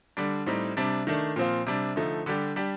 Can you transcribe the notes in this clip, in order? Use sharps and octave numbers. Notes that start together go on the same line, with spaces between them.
D3 G3 D4
A2 G3 C4 D#4
C3 G3 D4
D#3 A3 D4
A#2 F3 C4 F4
C3 G3 D4
D3 F3 A3 D#4
D3 G3 D4 G4
G3 D4 G4